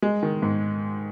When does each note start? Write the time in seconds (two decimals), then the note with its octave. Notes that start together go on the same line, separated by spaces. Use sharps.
0.02 G#3
0.23 D#3
0.42 G#2